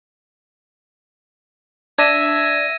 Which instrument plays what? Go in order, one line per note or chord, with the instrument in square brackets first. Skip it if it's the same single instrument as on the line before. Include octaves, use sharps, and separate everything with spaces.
[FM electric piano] D4 [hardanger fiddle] E5 [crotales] G#6 A#6 D#7